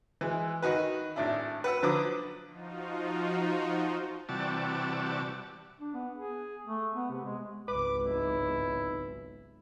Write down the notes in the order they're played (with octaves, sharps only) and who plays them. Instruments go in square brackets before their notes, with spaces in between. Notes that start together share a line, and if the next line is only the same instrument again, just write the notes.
[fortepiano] E3 G#3
D#3 D#4 F#4 B4
G#1 A2 D4 E4
B4 F#5 E6
D3 F3 F#3 B4 D6 D#6
[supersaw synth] F3 D#4 F4 F#4
[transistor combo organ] C3 E3 G3 F#4 D5 A5
[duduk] D4
B3
G#4
A3
B3
C3
G#3
[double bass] G#1 C#2 [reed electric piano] B4 [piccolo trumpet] D6
[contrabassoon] B1 [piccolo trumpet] E4